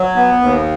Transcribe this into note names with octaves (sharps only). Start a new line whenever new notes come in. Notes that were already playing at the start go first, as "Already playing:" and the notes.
Already playing: F#3
B3
D#2